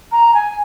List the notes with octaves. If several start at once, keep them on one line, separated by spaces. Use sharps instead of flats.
A#5
G#5